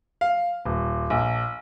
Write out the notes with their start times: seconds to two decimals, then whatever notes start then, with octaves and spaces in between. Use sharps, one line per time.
0.21 F5
0.65 D#1
1.10 A#1